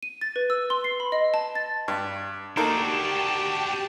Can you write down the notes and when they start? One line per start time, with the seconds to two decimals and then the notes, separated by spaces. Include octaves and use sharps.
0.03 D#7
0.21 A6
0.36 B4
0.50 E6
0.70 C6
0.84 C7
1.00 B5
1.12 D#5
1.34 A5
1.55 A6
1.88 G2
2.57 A#3 D4 D#4 F#4 G4 A4 G5 A5